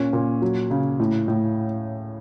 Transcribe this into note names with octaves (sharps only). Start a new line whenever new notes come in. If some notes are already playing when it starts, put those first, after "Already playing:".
Already playing: A#2 C#4
A#2
F#3
C#3
A2
A2